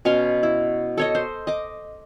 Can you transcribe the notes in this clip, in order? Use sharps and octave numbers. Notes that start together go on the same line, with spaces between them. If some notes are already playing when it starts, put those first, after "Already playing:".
B2 C#4 F5 C6
E4
A4 C#5 D#5
C5
D#5 D6